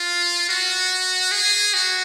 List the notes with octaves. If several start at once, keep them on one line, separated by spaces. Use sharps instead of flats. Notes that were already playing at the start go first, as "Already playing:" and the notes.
Already playing: F4
F#4
G#4
F#4